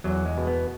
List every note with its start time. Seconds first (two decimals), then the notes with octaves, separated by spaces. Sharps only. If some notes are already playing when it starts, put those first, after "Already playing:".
0.04 E2 F#3
0.26 G#3
0.37 B2
0.47 B3